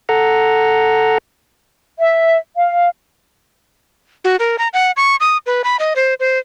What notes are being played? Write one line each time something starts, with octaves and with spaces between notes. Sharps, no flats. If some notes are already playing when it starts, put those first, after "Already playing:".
A4 F#5 A#5
E5
F5
F#4
A#4
A#5
F#5
C#6
D#6
B4
B5
D#5
C5
C5